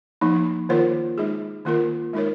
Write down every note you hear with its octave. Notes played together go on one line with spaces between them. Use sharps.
F3 A#3 D#4
D#3 A#3 F4 A#4 C#5
G#3 D#4 G#4
D#3 A#3 F4 A#4
G#3 D#4 A#4 C#5